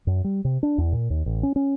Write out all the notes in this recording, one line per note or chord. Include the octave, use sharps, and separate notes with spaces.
F#2
G3
C3
D4
E2
A#2
D#2
A1
C#4
C#4